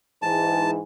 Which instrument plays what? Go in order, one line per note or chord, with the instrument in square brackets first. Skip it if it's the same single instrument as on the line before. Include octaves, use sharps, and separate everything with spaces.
[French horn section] G#2 E3 [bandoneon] A5